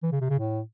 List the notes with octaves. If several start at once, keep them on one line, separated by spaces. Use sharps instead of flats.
E3
C#3
C3
C#3
A2